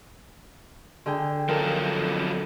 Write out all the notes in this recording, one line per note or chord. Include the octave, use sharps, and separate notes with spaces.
D3 G#4 G5
F3 F#3 A4 A#4